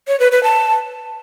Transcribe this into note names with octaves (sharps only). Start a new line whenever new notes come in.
C#5
B4
B4
A5